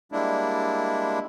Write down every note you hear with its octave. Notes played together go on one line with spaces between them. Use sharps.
G3 G#3 A#3 D4 E4